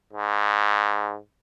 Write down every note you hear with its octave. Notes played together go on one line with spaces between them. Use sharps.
G#2